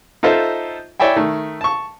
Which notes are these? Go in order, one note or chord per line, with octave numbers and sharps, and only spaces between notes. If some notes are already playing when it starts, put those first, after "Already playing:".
D#4 F4 A4 C5 E5
E4 C#5 D5 E5 G5 G#5
D#3 A3
A5 C#6